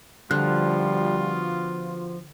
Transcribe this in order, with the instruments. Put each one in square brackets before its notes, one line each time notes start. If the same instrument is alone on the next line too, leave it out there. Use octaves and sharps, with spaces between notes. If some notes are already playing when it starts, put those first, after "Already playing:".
[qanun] D3 [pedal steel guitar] F3 F#6 [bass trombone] G3 [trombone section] B3 F4 F#4